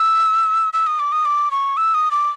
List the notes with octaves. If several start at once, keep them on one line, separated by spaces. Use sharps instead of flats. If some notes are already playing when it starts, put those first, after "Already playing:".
Already playing: E6
E6
D#6
D6
D#6
D6
C#6
E6
D#6
D6